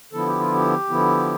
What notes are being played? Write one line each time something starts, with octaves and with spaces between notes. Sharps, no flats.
D3 F3 B3 E4 A4
G4
F4
G4
D3 F3 B3 E4